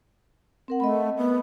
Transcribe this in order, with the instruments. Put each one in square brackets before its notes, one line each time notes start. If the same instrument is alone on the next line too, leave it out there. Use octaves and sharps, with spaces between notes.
[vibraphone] C4 A#4 F#5
[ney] A3 [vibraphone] D#5 B5
[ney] B3